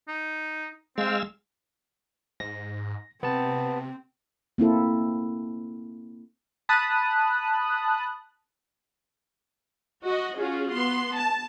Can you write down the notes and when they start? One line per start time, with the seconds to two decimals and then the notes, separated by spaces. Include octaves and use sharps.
0.08 D#4
0.98 G#3 C4 F5 E6
2.40 G#2 A#6
3.23 C3 B3 C4 A5
4.58 A#3 C4 E4 A4
6.69 A5 B5 D#6 F#6
10.03 F#4 D#5
10.38 C#4 F4 F#4 G#4
10.70 B3 C6
11.17 A5